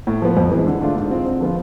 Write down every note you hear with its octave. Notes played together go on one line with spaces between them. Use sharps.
A2
F3 B3
F2
E3 G#3
D3
A3 D4 F4
G#2
G#3 C4 F4
D3
F3 B3 F4